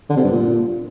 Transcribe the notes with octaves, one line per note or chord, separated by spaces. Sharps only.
D3
C3
G2
A#2